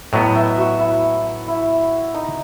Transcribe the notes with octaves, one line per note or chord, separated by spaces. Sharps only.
A2 F#3 B3 D#5
E5
F#4
E4
E4
D#4